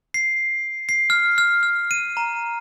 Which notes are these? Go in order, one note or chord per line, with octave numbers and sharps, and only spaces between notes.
C7
C7
F6
F6
F6
D#7
A#5